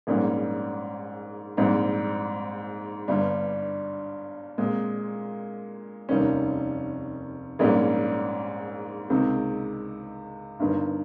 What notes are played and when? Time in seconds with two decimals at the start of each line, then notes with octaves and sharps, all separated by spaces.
0.07 A#1 G#2 G3 A#3 C#4
1.57 A#1 G#2 G3 C4
3.08 G1 G2 G3
4.58 A#2 G#3 C4
6.09 F1 D#2 D#3 G3 C#4
7.59 A#1 G#2 G3 A#3 C#4
9.10 C#2 C3 D#3 G#3 C4
10.60 G1 G2 D#3